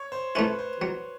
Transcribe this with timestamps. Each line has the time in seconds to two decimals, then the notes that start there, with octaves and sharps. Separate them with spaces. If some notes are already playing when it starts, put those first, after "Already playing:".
Already playing: C#5
0.12 C5
0.35 A3 C#4 E4 B4
0.59 C5
0.82 F#3